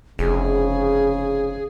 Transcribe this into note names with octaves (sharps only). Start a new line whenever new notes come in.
F1 C#3 G#4